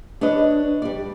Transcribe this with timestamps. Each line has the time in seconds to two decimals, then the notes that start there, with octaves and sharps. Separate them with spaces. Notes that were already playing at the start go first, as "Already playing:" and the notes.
0.21 D4 B4 C#5 D#5
0.82 G3 D5